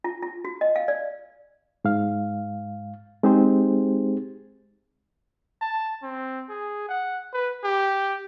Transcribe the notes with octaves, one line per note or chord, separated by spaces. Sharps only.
F4
F4
F#4
D#5
F5
D5
G#2 F5
G#3 C4 D#4 G4 G#4 C5
A5
C4
G#4
F#5
B4
G4